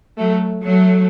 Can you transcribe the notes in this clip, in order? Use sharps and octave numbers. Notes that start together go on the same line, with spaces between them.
F#3 A3
F#3 A3